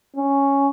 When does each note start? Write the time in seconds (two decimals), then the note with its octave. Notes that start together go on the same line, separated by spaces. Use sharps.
0.17 C#4